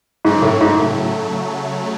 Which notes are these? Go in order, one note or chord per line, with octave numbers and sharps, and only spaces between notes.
G#2 C#3 F#3 A3
A2
G#2
A2